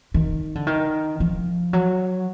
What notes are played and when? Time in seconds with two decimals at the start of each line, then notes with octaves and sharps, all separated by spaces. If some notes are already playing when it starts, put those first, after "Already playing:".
0.14 D#3
0.55 D3
0.67 D#3
1.20 F3
1.73 F#3